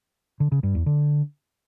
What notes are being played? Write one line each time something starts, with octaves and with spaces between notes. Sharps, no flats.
D3
C#3
G2
E2
D3